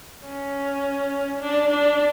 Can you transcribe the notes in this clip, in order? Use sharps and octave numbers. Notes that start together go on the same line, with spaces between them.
C#4
D4
D4